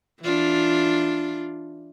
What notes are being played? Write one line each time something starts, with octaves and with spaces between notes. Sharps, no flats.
E3 D4 F4